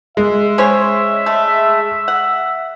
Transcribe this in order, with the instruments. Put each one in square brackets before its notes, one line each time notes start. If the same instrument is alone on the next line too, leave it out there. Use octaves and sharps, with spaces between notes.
[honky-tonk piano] G#3 [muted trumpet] E5
[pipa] C#4 C5 C#5
A3
F#5